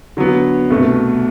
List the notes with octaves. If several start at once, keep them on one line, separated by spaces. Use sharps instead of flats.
D3 F#3 B3
C2 B2 A3